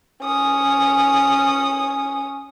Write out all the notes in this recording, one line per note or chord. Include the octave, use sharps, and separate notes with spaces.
C#4 D#6